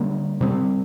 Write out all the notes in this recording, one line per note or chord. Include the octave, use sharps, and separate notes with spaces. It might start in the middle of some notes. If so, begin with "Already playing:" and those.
Already playing: D3 G3 A#3
C3 G3 C4